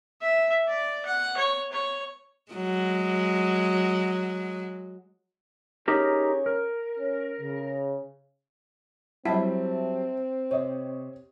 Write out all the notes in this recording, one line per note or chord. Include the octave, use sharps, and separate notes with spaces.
E5
D5
F#5
C#5
C#5
F#3 G#3
C#4 D#4 G4 G#4 A#4 C#5
A#4
C#4
C#3
F#3 G3 C4 E4 E5 G5 A5
C3 C#5 D#5